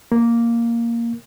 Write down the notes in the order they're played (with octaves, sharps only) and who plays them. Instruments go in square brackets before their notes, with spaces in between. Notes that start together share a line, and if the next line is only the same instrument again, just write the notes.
[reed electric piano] A#3